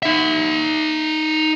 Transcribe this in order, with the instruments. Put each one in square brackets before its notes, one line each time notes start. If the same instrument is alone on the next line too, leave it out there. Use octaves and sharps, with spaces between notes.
[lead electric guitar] D#4 E5